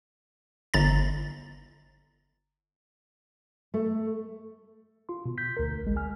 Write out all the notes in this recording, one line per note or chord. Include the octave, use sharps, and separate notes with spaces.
G1 A#5 A6
A3
F4 C6
B2
G6 B6
D2 A#4
A1 G#3
G#5 F6